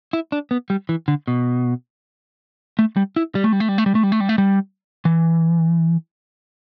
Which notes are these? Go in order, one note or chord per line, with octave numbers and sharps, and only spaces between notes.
E4
D4
B3
G3
E3
D3
B2
A3
G3
E4
G3
A3
G3
A3
G3
A3
G3
A3
G3
A3
G3
A3
G3
E3